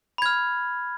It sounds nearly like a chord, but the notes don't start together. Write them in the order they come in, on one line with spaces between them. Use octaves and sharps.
B5 G#6 F6